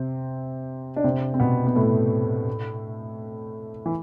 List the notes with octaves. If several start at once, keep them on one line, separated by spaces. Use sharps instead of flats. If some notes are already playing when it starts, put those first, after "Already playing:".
Already playing: C3 C4
D4
C3 C4
C4
B2 B3
B3
A2 A3
E3